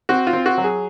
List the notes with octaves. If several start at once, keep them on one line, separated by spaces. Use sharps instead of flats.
C4 F#4
F4
C4
F#4
F#3
G#4